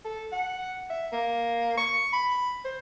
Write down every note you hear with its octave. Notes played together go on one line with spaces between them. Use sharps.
A4
F#5
E5
A#3
C#6
B5
C5